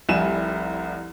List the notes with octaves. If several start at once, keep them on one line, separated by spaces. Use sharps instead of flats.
F1 C2 G3 E4 G#5 E7